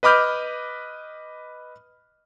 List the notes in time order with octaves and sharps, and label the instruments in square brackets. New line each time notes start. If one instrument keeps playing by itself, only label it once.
[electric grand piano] B4 D#5 B5 D6 F6 G6